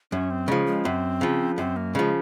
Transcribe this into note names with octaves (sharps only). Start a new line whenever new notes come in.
F#2 C#4
C4
C#3 F3 G#3
G#3
F#2 C4
C#3 F3
F#2 C4
A#3
C#3 F3 G#3